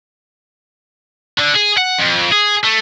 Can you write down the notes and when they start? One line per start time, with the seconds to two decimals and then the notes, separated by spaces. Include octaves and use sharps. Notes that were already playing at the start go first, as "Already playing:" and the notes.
1.38 D3
1.54 G#4
1.77 F#5
1.99 F2
2.32 G#4
2.64 A3